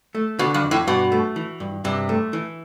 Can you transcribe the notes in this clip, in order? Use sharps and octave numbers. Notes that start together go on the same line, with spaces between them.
A3
B2 D3
G2
F2
A2
G2 B2
A3
E3
G2
G2 C3
A3
E3